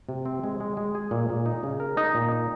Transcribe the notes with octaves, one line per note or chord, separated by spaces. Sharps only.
C3
C4
G#3
G#3
G#3
G#4
A#2
A#2
D#4
C#3
A#4
D#4
A#2
D#4